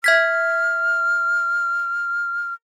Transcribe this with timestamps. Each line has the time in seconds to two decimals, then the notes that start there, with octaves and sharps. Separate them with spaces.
0.04 E5 F6 G#6 B6